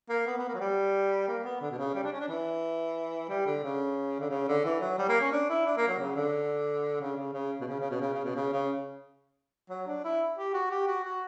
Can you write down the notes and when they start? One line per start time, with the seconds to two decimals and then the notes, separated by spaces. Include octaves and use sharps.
0.09 A#3
0.26 B3
0.38 B3
0.48 A#3
0.54 F#3
0.60 G3
1.28 A#3
1.44 B3
1.61 D3
1.71 B2
1.78 C#3
1.95 G3
2.03 D4
2.12 C#4
2.20 D4
2.28 E3
3.29 G3
3.46 D3
3.63 C#3
4.20 D3
4.30 C#3
4.48 D3
4.65 E3
4.81 F#3
4.98 G3
5.09 A#3
5.21 C#4
5.32 D4
5.49 E4
5.66 D4
5.77 A#3
5.88 F#3
5.99 C#3
6.16 D3
7.01 C#3
7.17 C#3
7.33 C#3
7.61 B2
7.67 C#3
7.80 C#3
7.90 B2
8.01 C#3
8.13 C#3
8.24 B2
8.35 C#3
8.52 C#3
9.70 F#3
9.87 D4
10.04 E4
10.38 G4
10.54 F#4
10.70 G4
10.87 F#4
11.04 F#4